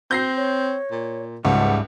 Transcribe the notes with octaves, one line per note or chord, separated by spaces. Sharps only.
C4 G6 A#6 C7
C#5
A#2
C#2 G#2 F3 G3 A3 F#5